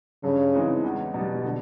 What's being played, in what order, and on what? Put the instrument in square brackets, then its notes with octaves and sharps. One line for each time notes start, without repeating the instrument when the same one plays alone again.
[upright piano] G2 [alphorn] C#3
[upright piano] E3 G#3 C4 D#4
E2
B2 G3
D3